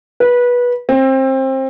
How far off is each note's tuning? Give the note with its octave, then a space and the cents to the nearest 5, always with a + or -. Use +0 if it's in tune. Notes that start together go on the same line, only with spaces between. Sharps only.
B4 -20
C4 +25